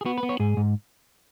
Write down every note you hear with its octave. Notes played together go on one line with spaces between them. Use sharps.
G#4
B3 F#4
B4
B3
C#5
G#2 G#4
G#2